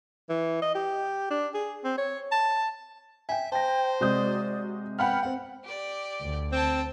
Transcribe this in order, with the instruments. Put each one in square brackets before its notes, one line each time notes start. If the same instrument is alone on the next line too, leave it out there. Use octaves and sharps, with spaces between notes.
[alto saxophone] E3
D#5
G4
D4
G#4
C4
C#5
A5
[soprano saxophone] E5 [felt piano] G5 G#5
[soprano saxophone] C5 [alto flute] G5 [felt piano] A5 A#6
[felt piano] C3 G#3 G6 [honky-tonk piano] F#4 D#6 [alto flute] D5
[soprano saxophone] B3 [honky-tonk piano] F#5 B5 F6 [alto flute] G5
[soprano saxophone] B3 [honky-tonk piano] C4 F#5
[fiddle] G4 D5
[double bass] D2
[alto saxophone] C4 [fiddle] G5 A5